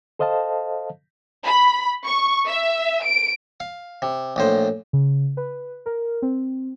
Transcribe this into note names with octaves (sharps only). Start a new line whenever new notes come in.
A4 C5 D#5 F5 A5
B5
C#6
E5
D7
F5
C3
A#1 A2 C5
C#3
B4
A#4
C4